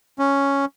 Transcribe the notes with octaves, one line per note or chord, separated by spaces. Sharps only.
C#4